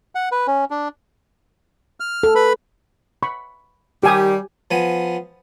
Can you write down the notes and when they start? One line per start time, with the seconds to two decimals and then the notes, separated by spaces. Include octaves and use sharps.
0.15 F#5
0.32 B4
0.47 C#4
0.70 D4
2.00 F6
2.23 A4
2.35 B4 B5
3.23 B5 C#6
4.03 D#3 G3 G4 G#5 D#6
4.71 F3 B3 G#5